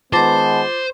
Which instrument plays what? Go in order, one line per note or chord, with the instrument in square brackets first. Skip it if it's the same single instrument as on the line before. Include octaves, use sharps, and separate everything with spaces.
[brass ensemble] D#3 G#3 B3 [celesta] F4 D6 A6 [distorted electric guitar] C5 [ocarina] A5